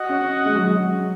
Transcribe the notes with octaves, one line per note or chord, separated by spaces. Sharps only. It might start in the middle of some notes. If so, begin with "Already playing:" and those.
Already playing: F#4 D#5 F#5
C#4
G#3
F#3
G#3